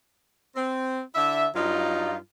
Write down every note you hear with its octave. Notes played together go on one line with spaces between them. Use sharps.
C4
D3 E4 E5
G2 F#3 D#4 F4